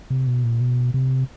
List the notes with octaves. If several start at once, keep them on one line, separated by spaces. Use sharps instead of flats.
C3
B2
A#2
B2
C3